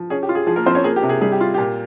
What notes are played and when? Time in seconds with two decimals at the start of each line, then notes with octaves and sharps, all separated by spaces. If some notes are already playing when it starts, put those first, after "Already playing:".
Already playing: F3
0.10 C#4 G#4
0.23 G4
0.29 F4
0.35 G#4
0.47 F3 G#4
0.56 A#3 A#4
0.66 F3 C4 C5
0.75 C#4 C#5
0.84 A#3 G#4
0.96 G4
1.03 C3
1.09 G#4
1.21 G3 G#4
1.32 G4
1.41 F4
1.54 A#2 G4